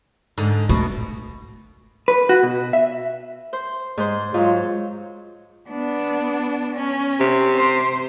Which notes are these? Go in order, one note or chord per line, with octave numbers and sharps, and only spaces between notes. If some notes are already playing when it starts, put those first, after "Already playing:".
G#2 D3
B2 A3
B4
F#4
B2
E5
C5
G#2 C5
G#2 F#3 F4
B3 D4
C#4
C3
C5